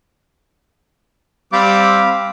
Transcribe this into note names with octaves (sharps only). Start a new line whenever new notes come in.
G3 C4 F5 B5 D6